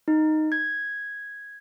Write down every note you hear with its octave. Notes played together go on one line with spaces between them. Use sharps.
D#4
G#6